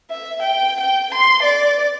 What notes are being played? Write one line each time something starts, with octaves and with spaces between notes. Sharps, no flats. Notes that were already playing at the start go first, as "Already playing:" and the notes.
E5
G5
G5
C6
D5